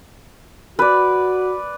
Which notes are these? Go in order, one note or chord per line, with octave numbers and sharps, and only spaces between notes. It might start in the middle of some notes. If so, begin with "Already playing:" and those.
F#4 B4 D5